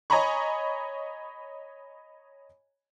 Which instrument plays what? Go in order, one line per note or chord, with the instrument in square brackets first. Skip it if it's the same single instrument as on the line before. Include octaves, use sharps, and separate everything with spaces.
[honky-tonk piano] C#5 D#5 G#5 A#5 B5 C#6